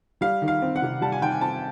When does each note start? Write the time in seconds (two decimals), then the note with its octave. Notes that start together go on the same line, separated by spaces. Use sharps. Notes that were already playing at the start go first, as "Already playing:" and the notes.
0.21 G3 F5
0.42 D#3
0.48 F5
0.62 C4
0.76 F#5
0.82 C3
1.01 G3 A5
1.12 G#5
1.21 D#3 G5
1.32 G#5
1.41 C4 A5